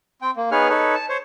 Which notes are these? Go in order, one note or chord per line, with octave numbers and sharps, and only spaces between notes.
C4 G5
A#3
B3 D#4 G#4 B4 C#5 F6
D#4 A4 B4 C#5
A5
C5 C#5